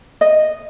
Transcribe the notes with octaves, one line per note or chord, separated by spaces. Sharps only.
D#5